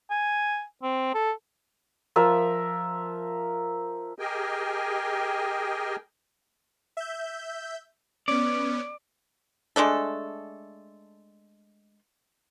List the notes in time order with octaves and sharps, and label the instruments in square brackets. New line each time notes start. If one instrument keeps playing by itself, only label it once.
[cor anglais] G#5
C4
A4
[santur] F3 A#4 E5
[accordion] G4 G#4 A#4 D#5 G5 G#5
[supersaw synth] E5 G6
[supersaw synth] B3 C#4 [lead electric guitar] D5
[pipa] G#3 A3 D4 A4